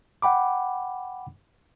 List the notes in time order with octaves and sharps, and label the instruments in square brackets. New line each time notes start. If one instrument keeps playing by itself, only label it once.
[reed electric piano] F#5 G5 B5 D6